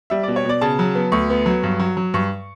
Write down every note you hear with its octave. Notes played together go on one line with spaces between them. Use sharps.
G3 E5
B2 D5
C#5
B2 D5
C#3 A5
F#3
B3
D2 C#6
B3
F#3
G2
F#3
F#3
G2 C#6